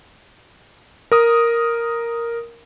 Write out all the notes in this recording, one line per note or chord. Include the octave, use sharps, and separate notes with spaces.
A#4 D#6